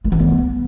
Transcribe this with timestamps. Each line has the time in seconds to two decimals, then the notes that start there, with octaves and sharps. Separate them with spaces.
0.04 G#3
0.12 E3
0.19 B3